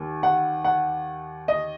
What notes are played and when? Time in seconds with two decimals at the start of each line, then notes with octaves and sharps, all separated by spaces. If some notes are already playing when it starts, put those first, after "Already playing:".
Already playing: D#2
0.23 F#5
0.64 F#5
1.48 D#5